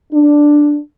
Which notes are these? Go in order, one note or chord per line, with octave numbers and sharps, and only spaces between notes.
D4